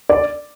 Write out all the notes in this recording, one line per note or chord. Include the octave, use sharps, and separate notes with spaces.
D5